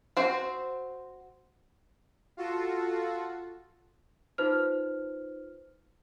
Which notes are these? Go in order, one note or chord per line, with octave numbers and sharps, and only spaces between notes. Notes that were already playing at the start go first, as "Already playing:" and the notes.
C4 F#4 C5
F4 F#4 A4
D#4 F4 B4 C5 F6